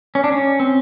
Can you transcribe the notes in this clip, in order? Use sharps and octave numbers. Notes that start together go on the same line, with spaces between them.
C#4
D4
C#4
C4